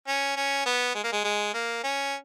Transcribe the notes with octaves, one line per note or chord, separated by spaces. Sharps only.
C#4
C#4
B3
G#3
A#3
G#3
G#3
A#3
C#4